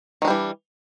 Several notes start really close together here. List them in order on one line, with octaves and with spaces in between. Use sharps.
D#3 D4 G3 E3